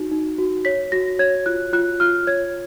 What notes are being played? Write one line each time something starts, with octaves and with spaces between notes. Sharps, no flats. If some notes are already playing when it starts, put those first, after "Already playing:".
Already playing: D#4 F#4
D#4
F#4
C#5 B6
F#4 A#6
C#5 G#6
F4 F#6
F4 F#6
F4 F6
C#5 G#6